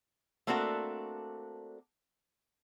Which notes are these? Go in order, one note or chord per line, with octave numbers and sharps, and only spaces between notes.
A3 A#3 C4 D4 F#4 A4